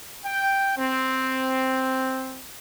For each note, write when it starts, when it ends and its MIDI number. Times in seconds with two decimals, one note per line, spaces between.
0.25 0.73 79
0.77 2.42 60